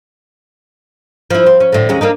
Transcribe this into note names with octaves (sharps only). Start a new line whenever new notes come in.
F3 E4
C4
C#4
A2 D3
D#2 G#3 C#4
A#3 D4 D#4